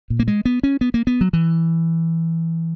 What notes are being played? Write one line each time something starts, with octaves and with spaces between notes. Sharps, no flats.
A#2
A#3
G#3
B3
C#4
B3
A#3
B3
F#3
E3